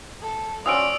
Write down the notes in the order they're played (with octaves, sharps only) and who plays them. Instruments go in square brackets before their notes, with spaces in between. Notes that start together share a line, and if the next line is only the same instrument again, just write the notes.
[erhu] A4
[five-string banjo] F3 C#4 F#4 [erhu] D5 [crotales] D#6 E6 D7